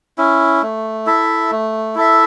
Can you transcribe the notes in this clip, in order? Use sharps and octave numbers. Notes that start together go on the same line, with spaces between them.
C#4 E4
A3
E4 A4 E5
A3
E4 A4 E5